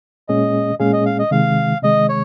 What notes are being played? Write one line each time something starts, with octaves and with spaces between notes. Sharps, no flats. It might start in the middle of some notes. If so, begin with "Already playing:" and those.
A#2 G#3 C#4 G#4 D#5
A#2 G#3 C#4 G#4 F5
D#5
F5
D#5
C3 D#3 G#3 F5
C3 D#3 G#3 D#5
C#5